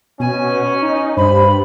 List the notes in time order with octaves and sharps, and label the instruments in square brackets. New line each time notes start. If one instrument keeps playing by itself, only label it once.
[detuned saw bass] B2 [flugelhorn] C#4 [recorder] G#5
[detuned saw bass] D#4
[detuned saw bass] G2 [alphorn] C5 [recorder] B5